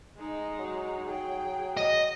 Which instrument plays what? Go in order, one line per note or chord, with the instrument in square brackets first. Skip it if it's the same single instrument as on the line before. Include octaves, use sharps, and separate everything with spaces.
[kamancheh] G#3 D#4
[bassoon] F#3
[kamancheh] G#4 G5
[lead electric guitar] D#5